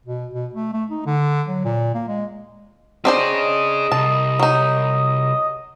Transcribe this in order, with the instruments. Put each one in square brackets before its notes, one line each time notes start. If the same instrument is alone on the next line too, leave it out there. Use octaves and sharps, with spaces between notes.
[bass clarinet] B2
B2
A3
A3
D#4
D3
F#3
A#2
A#3
G#3
[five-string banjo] C4 D4 C5 [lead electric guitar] G#4 C#5 [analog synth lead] D#5
[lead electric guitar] C2 [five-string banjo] A5
[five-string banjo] F#3 D#4